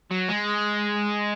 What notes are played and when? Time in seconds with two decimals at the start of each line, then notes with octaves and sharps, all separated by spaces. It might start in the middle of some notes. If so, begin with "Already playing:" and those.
0.11 F#3
0.29 G#3